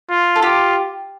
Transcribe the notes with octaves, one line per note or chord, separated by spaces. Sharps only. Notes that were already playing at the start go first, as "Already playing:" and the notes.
F4
A4
F4 G4